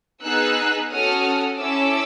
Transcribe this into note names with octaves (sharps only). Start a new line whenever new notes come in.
B3 D#4 G#4 E6 F#6
C#4 F#4 A4 D#6 F6
C#4 E4 A4 D6 E6